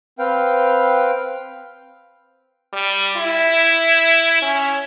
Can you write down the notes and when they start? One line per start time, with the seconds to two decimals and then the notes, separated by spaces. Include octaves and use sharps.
0.19 C4 B4 F5 G5
2.73 G3
3.17 E4
4.42 C#4